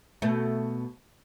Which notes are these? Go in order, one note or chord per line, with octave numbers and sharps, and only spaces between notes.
B2 A3